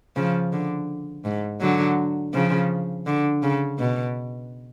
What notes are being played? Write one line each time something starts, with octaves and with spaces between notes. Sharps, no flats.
C#3 F3
D3
G#2
D3 F#3
C#3 F3
D3
C#3
B2